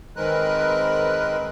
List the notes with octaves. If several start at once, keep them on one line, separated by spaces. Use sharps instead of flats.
D#3 G#3 C4 A#4 B4 F#6